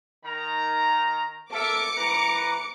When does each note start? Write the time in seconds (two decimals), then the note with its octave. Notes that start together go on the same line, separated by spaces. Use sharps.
0.24 D#3 A#5
1.52 A4 A#4 E5 D6 C#7
1.97 E3 B4 A#5